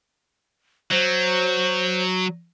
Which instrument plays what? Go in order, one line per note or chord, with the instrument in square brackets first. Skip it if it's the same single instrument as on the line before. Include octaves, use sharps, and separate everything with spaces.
[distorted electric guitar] F#3 [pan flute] C5